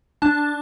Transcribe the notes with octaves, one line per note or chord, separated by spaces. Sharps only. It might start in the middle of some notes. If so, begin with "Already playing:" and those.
D4 A5